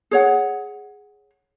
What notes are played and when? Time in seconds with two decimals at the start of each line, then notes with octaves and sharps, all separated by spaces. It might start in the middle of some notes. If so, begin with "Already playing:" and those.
0.11 G#4 C#5 F#5